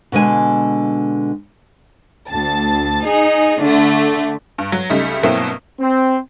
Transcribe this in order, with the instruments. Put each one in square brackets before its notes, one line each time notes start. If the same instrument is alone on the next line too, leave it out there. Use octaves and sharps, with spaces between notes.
[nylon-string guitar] B2 D3 G#3 G#5
[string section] D2 A5
D#4 G#4
D3 A3
[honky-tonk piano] G2
F#3
C#2 G3 A3 D#4
G2 B2 F#3 A#3 C4 E4
[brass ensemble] C4